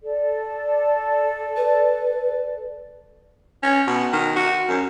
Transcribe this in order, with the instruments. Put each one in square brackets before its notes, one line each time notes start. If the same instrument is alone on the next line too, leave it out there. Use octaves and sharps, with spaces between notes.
[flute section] A4 D5
[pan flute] B4
[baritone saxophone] C#4
B2
D#3
F#4
F#2